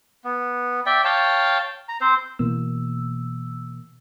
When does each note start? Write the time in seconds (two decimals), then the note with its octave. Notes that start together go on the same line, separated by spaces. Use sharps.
0.24 B3
0.86 D5 E5 G5
1.05 C#5 F5 G5 A5
1.89 A#5
2.01 C4 C5
2.39 B2 E3 A#3 E6